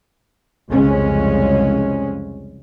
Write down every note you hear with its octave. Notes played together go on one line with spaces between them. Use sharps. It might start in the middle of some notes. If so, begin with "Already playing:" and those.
C2 F2 C#3 G#3 C#4